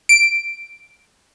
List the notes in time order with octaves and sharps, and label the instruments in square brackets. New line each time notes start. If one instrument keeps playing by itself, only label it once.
[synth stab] D7